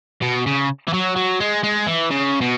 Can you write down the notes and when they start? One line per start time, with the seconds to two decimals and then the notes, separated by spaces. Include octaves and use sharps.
0.22 B2
0.47 C#3
0.88 E3
0.94 F#3
1.17 F#3
1.40 G#3
1.64 G#3
1.87 E3
2.11 C#3
2.41 B2